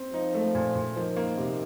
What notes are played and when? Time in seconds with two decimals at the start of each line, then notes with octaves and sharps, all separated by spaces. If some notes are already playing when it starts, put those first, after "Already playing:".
Already playing: C4
0.13 F3 D#4
0.34 A3
0.55 A#2
0.75 A#2
0.96 D#3 F3
1.16 A#3
1.37 C3